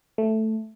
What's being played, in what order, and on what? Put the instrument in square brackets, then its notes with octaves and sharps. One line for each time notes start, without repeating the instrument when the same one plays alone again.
[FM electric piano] A3